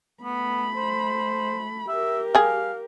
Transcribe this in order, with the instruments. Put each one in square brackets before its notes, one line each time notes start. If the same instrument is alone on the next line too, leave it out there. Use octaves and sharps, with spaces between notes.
[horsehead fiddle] A3 B5 [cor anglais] B3
[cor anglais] C5
[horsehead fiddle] G4 A#4 [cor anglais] E5
[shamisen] G3 G#4 [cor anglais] F5